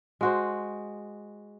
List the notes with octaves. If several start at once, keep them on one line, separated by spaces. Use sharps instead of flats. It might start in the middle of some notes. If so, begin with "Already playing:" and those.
G#3 F#4 C5